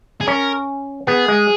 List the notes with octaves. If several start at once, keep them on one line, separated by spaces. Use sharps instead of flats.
G#4
C#4 A#4
B3 G#4
G#3